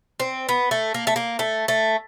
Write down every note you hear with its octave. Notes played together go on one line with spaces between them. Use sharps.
C4
B3
A3
A#3
A3
A#3
A3
A3